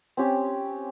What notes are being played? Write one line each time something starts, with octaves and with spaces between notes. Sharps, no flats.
C4 C#4 G4